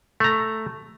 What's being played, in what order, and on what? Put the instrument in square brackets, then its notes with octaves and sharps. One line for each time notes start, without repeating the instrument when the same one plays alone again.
[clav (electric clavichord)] A3 A#5